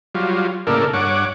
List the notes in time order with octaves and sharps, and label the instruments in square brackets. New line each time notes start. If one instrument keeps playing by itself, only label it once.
[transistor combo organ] F#3 G3 F4
A2 C#3 A#3 A4 A#4 D5
G2 C#5 F#5 D6